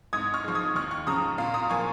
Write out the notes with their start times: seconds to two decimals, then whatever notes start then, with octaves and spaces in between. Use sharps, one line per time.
0.13 G#2 D#6 G#6
0.34 C#6 F6
0.44 F3 G#3
0.55 D#6 G#6
0.75 D#2 C#6 F6
0.91 C#6 F6
1.07 C#3 F3 A#5 D#6
1.38 A#2 F5
1.54 A#5 D#6
1.70 F3 A#3 G#5 C#6